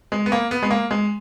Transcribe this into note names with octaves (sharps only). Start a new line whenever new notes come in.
G#3
B3
A#3
B3
G#3
A#3
G#3